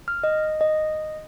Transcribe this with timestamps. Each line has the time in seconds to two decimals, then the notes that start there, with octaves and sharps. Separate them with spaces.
0.08 F6
0.24 D#5
0.61 D#5